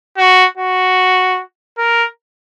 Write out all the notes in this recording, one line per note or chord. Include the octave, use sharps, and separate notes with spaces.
F#4
F#4
A#4